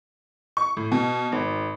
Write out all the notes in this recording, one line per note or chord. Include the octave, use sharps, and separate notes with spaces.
C#6
A2
B2
G#1